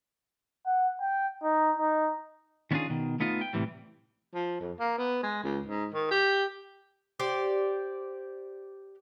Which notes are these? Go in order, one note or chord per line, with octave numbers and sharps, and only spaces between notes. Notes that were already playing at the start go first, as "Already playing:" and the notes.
F#5
G5
D#4
D#4
D#3 B3 C#4 D4 F4 G#4
B2 D#3
A3 B3 D#4 F4
G5
A2 C3 E3 G3
F3
F2
A#3
B3
G#3
C#2
G#2
D#3
G4
G4 C5 D5